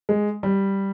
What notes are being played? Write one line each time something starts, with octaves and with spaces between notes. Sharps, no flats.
G#3
G3